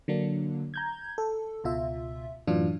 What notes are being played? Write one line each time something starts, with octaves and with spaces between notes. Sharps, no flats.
D3 F#3 A#3 D4
A#5 G6 G#6
A4
C#2 B2 F4 E5
F#2 A2 E3 F#3 D4 F4